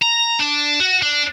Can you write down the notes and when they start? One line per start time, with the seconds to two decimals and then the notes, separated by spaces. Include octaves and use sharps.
0.02 A#5
0.39 D4
0.80 F#4
1.03 D4